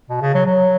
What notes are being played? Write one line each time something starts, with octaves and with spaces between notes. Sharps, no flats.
B2
C#3
F#3
F#3